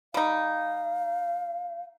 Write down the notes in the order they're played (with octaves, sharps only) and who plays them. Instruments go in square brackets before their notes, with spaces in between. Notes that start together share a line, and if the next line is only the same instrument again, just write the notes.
[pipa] G3 D#4 [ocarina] F5